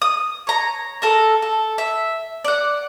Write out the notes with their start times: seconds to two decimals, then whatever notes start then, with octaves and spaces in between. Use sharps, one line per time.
0.02 D#6
0.47 C#5 A#5
1.02 A4 A#4
1.42 A4
1.78 E5
2.44 D5 F#5